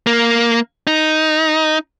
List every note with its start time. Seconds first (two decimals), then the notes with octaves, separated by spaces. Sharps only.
0.07 A#3
0.87 D#4